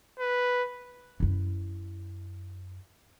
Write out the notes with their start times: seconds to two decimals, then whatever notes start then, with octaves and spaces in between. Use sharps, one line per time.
0.19 B4
1.20 F#2 E4